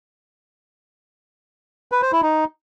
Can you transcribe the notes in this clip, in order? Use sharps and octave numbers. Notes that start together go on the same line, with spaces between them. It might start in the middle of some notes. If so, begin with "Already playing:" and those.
B4
C5
E4
D#4